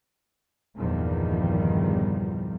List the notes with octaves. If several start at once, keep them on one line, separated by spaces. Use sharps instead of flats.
G1 E2 A#2 D#3 F3 G3